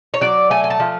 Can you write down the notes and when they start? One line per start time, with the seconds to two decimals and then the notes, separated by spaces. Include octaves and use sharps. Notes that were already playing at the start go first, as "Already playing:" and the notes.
0.14 C#5
0.21 F#3 D5
0.50 A3 G#5
0.64 G#5
0.70 A5
0.80 F3